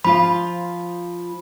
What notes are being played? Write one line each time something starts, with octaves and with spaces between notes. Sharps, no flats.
F3 F4 F5 B5